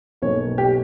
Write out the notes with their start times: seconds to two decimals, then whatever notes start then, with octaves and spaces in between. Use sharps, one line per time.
0.22 B1 B2 A#3 C#5
0.58 G4